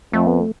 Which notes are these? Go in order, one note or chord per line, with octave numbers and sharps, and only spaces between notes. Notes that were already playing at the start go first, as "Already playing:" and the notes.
F2 A3
B3
A3